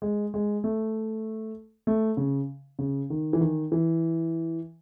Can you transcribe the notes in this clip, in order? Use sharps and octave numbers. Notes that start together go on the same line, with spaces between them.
G#3
G#3
A3
A3
C#3
C#3
D#3
E3
D#3
E3